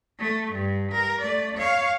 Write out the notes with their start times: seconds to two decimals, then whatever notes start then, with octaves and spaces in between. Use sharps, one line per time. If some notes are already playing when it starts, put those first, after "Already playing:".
0.19 A3
0.52 G2
0.92 A#4
1.22 A3 D5
1.57 C#5 F5